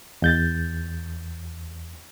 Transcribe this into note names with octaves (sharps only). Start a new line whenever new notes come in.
E2 G6 A6